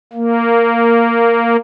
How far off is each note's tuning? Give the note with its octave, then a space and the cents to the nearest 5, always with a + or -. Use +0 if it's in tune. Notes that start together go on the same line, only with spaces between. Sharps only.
A#3 -10